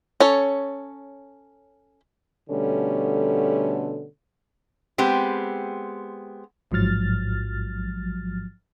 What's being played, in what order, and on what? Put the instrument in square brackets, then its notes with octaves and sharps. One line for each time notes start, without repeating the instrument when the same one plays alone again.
[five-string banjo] C#4 A4 C#5
[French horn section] B2 D3 G3 A3 C#4 A4
[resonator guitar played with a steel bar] G#3 B3 C4 G4
[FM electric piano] A1 G#2 F3 F#3 F6 A6